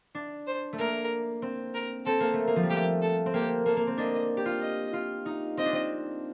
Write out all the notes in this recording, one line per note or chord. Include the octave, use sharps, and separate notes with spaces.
D4
C5
A3
A#3 A#4
C4
A#4
C4 A4
A#3
A3
A#3
F3
G3
A3 G4
A4
C4
A#3 G4
A#3 A4
A#3
C4
D4 D#5
G4
F4
D#5
F4
D#4
C4 D#5
D4
C4